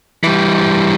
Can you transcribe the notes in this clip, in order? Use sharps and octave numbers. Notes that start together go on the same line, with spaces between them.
E3 G3